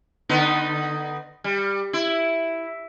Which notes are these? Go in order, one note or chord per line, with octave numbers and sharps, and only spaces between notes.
D3 B3 D#4
G3
E4